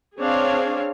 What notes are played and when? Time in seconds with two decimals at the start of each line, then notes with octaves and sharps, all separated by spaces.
0.20 C4 D4 G#4 C#5 F5